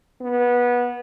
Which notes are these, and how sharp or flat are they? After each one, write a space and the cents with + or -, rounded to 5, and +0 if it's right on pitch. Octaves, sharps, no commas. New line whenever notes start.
B3 -20